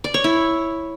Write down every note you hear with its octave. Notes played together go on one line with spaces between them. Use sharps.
D5
C#5
E4